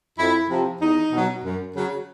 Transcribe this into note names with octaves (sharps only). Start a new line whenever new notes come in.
F2 E4
C3 F3
E2 D#4
B2
F#3
F#2
C#3 F#3